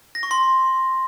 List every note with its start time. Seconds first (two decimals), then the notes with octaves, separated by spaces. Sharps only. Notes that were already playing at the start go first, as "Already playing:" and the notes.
0.15 A#6
0.23 C#6
0.31 C6